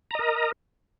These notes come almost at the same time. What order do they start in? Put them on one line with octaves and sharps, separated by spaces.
A#5 D#5 A#4